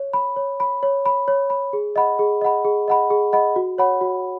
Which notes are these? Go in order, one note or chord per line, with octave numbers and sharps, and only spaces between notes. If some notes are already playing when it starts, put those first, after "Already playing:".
Already playing: C#5
B5
C#5
B5
C#5
B5
C#5
B5
G#4
D#5 F#5 B5
G#4
D#5 F#5 B5
G#4
D#5 F#5 B5
G#4
D#5 F#5 B5
F#4
C#5 F#5 B5
F#4